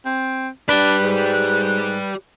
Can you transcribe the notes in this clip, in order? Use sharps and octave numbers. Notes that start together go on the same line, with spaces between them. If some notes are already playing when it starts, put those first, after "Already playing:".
C4
D4 G4 B4 D5
G#2